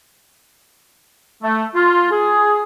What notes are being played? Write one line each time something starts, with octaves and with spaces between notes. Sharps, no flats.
A3
F4
G#4